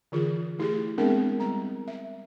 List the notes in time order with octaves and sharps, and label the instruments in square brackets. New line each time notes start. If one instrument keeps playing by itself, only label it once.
[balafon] D3 E3 F4 G#4
A3 E4 G4 G#4
G#3 B3 C4 D4 G#4 A#4
G3 A#5
E5